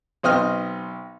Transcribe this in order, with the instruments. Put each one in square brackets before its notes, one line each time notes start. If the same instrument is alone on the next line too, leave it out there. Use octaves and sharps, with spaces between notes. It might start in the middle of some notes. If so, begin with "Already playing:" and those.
[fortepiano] B1 C4 D#5 F6